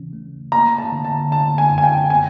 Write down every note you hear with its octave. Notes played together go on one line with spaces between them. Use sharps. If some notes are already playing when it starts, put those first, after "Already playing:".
Already playing: C#3 E3 C#4
A3
A#3 A#5
A5
D3
A5
D3 A5
G#5
F#2
G#5
G5
B3 G#5